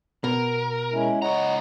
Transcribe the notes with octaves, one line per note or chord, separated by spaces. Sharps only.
B2 A#4
G#3 C#4 E4
C#2 C#5 D#5 F#5 A#5